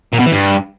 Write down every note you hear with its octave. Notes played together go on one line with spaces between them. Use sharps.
A#2
B2
E3
G2